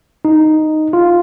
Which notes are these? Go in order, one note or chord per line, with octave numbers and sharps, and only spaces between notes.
D#4
F4